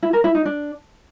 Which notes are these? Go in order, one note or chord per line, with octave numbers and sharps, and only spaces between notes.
E4
A#4
E4
D#4
D4